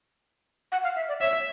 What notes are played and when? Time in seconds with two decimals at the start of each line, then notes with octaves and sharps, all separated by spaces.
0.72 F#5
0.84 F5
0.96 E5
1.08 D5
1.21 C#5 E5